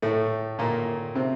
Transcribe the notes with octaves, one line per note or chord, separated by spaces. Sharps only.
A2 A3
A#2 A#3
C3 C4